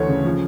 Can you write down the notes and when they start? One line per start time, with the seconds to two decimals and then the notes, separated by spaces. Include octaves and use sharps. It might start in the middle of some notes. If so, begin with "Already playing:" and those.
Already playing: D2 E3 A3 C#5
0.08 C#3
0.25 F3